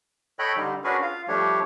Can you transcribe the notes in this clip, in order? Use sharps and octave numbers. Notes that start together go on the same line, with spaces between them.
A4 C#5 D#5 G5 B5 F#6
D3 G3 D#4
C#4 D4 F#4 G#4 A#4 B4
F4 F5
F3 G3 A3 D4 G4 C#5